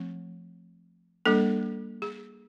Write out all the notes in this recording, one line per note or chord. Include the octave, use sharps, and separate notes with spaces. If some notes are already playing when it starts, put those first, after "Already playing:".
Already playing: F3 A3 C4
G3 A#3 D4 A4
G#4